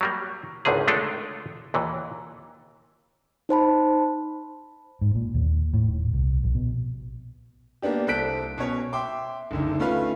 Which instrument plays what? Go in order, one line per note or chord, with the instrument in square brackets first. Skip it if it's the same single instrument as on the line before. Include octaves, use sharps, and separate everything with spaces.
[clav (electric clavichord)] F#3 G3 A#3
G#1 C#2 D3 D#3 G#4
G#3 A3 D4 F4 A4
D#2 A#2 E3
[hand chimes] D#4 C5 A5 B5
[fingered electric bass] G#2
A#2
D#2
A2
D#1
C2
A#1
B2
[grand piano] A#3 B3 D4 G4
C2 A4 C5 F#6 B6 D7
B2 C#4 C#5
E5 G5 C6 D6
F#1 D2 D#3
A3 C#4 F4 B4 F5